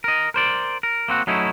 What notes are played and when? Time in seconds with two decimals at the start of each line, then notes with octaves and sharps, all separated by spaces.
0.04 A#4 D#5
0.34 A#4 C5 D5
0.83 A#4
1.08 A#3 C4 F#4
1.27 F#3 A3 C#4 D#4 E4